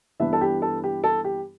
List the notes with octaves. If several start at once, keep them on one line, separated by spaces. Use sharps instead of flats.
G2 E3 B3 D4 E5
A4
G4
A4
G4
A4
G4